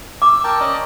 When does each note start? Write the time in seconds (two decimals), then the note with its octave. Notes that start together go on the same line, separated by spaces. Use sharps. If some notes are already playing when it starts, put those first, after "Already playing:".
0.22 D6 E6
0.44 A#4 G5 A5
0.60 C#4 D5 D#5